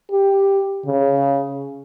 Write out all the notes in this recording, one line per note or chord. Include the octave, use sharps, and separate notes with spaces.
G4
C#3